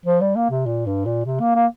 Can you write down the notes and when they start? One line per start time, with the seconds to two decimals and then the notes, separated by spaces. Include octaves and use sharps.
0.06 F3
0.21 G3
0.36 A#3
0.51 C3
0.66 A#2
0.86 G2
1.06 A#2
1.26 C3
1.40 A#3
1.56 A#3